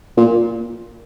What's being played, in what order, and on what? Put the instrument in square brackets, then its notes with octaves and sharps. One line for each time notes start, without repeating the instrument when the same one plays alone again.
[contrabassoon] A#2